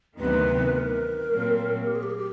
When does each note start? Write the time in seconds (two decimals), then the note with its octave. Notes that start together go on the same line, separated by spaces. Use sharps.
0.18 D2 C3 D#3 F#3 B3 B4
0.75 A#4
1.31 A#2 F#3 A3 C4
1.87 G4
1.95 G#4
2.03 G4
2.11 G#4
2.18 G4